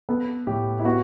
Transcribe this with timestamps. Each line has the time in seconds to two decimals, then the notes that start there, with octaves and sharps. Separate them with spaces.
0.09 B3 A4
0.47 A2 G4
0.80 E4
0.84 B3 F#4